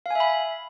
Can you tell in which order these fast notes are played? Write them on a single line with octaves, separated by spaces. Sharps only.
F5 G#5 E5 B5